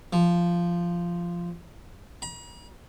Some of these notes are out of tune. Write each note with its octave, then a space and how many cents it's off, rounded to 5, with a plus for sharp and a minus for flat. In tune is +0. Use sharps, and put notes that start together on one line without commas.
F3 -10
A#5 +45